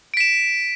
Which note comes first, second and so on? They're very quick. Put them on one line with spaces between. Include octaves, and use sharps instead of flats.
D7 B6 E7